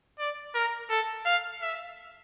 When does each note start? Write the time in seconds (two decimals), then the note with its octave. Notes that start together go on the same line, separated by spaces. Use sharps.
0.19 D5
0.55 A#4
0.90 A4
1.25 F5
1.62 E5